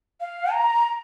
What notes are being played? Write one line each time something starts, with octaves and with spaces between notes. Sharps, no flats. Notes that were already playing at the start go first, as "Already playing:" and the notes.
F5
A#5